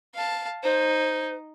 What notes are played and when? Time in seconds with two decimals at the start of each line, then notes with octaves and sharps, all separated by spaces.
0.14 F5 A5
0.63 D#4 C5